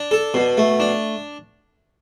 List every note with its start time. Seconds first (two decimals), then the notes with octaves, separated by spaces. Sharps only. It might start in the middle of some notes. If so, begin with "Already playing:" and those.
Already playing: D4
0.11 A4
0.34 B2
0.57 A3
0.80 D4